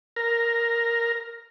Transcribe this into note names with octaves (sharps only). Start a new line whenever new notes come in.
A#4